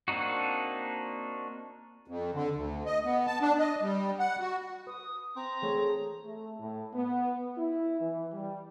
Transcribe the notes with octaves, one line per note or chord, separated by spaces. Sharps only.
A#3 C4 D4 D#4 F#4
F2
D3
D2
D#5
B3
A5
D4
D#5
G3
F#5
F#4
B4 D#6
C4 A#5
E3 A3 G#4 C#5
A3
A2
B3
E4
E3
G3